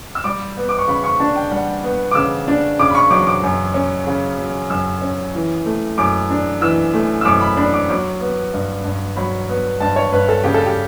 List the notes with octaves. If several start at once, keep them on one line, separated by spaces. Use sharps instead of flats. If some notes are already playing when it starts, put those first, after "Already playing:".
E6
G3 D6
B3
D6
C#6
C#3 B5
C#6
D4 A5
G5
G3 F#5
B3
D6
C#3 E6
D4
C#3 D6
B5
C#6
F#3 D6
D6
F#2
C#4
C#3
F#3
F#2 E6
C#4
E3
A3
F#2 D6
D4
E3 E6
A3
E6
F#2 D6
B5
D4 B5
D6
F#3 D6
B3
G2
G2
F#3 B5
B3
G2 A5
C#5
G2 B4
A4
C#3 G4
A4
G4